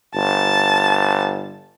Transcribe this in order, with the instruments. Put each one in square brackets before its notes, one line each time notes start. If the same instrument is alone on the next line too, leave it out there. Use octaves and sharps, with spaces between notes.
[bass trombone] G1 [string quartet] A5